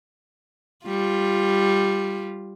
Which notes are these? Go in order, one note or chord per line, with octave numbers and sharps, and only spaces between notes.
G3 F4